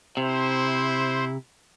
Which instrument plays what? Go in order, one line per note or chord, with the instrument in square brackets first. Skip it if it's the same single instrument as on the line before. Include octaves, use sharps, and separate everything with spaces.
[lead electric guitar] C3 [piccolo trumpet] E4 [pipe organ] C5